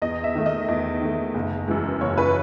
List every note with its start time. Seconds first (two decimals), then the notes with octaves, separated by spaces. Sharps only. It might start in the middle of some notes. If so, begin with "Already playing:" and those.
0.02 E2 D#5
0.24 E5
0.35 D#3 A3
0.46 D#5
0.68 E2
1.01 D#3 A3
1.35 F#1
1.68 F#2 E3 G#3
2.01 F#1 C#5
2.17 B4